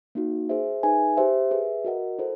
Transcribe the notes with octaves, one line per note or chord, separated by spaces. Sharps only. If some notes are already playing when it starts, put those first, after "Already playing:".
A#3 D#4 F#4
G#4 C5 E5
D#4 G#4 B4 E5 G#5
G4 C5 E5
G#4 B4 E5
F#4 A#4 D#5 F#5
E4 A4 C5